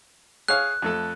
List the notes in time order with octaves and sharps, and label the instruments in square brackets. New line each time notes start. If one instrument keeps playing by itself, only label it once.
[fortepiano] G#4 C#5 F5 [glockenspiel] F#6
[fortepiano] F2 A3 A4